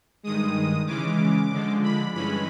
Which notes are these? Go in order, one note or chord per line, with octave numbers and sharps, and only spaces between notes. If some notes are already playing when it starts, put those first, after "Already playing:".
G2 D#3 G#3 D#6
C#3 E3 G#3 C#4 D6
D3 F3 G#3
B5
G2 E3 G#3 C#4 B5